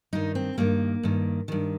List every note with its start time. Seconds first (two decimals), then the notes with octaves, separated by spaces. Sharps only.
0.13 G2 D#3 D#4
0.35 C4
0.58 G2 D#3 A#3
1.03 G2 D#3
1.48 G2 D#3